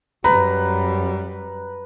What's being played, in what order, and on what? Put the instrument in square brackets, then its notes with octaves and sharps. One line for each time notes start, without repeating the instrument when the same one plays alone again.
[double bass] F#2 G3 [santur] B4 [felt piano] A#5